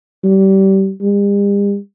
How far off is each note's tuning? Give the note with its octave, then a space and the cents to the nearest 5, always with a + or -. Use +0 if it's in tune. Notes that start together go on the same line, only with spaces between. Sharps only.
G3 -25
G3 +45